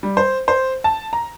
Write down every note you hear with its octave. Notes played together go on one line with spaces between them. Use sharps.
G3
C5
C5
A5
A#5